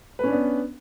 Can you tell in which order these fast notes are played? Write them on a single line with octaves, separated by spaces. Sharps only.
B4 C#4 D4 B3